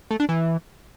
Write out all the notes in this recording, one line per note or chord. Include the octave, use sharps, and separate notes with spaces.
A3
D4
E3